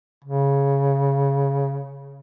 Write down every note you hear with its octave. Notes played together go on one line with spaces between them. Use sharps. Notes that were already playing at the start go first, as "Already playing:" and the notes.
C#3